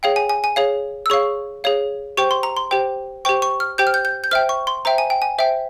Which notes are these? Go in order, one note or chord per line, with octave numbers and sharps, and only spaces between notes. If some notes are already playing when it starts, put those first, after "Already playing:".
G#4 C#5 F5 G5
G#5
G#5
G#5
G#4 C#5 F5
E6
G#4 C#5 F5 C#6
G#4 C#5 F5
G4 C5 G5 C#6
C6
A#5
C6
G4 C5 G5
G4 C5 G5 C#6
C#6
F6
G4 C5 G5 G6
F6
G6
G6
G6
C5 E5 G5 F6
C#6
C6
C5 E5 G5 A#5
G#5
G5
G#5
C5 E5 G5